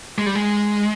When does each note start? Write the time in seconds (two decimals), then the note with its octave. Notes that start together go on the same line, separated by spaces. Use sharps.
0.18 G#3
0.26 G3
0.35 G#3